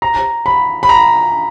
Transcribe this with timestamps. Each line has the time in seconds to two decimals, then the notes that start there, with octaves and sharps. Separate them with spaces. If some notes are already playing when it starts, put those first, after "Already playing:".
0.02 A#5
0.46 B5
0.83 B5
0.89 A#5